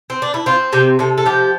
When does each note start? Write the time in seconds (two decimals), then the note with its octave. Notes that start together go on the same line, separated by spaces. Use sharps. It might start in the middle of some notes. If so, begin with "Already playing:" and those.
0.10 C4
0.22 D4
0.34 E4
0.46 C4 F4
0.73 C3 G4
0.99 C3 A4
1.18 A4
1.26 F3 G4